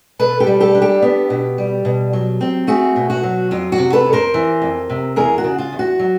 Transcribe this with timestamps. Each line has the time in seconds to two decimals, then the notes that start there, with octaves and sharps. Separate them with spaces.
0.19 B2 A4 B4
0.40 G4 A4
0.47 G3
0.60 G4 A4
0.74 D4
0.82 G4 A4
1.02 B3
1.30 B2
1.58 G3
1.85 B2
2.13 F#3
2.41 C4
2.67 A3 F#4 G#4
2.96 B2
3.10 F#4
3.23 F#3
3.51 F2 F4
3.72 F#4
3.78 C3
3.93 A4 B4
4.06 F2
4.13 A#4 C5
4.34 E3
4.62 F2
4.90 C3
5.16 E2 G#4 A#4
5.38 F#4
5.44 C#3
5.58 F4
5.72 E2
5.79 F#4
5.99 F#3